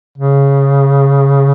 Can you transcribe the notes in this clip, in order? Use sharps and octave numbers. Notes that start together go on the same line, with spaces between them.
C#3